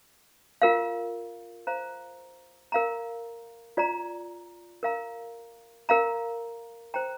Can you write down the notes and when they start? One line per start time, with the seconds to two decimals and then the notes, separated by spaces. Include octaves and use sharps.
0.62 F4 A#4 F5
1.67 C5 F5 A#5
2.72 A#4 F5 A#5
3.77 F4 D5 A#5
4.83 A#4 F5 A#5
5.89 A#4 F5 A#5
6.94 C5 G5 A#5